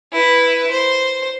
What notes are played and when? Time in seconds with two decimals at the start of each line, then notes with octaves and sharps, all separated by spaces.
0.13 E4 B4
0.71 C5